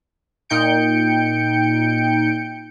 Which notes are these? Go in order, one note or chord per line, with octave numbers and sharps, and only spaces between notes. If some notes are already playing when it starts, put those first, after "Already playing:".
A#2 D#4 G5 G6 C#7 D7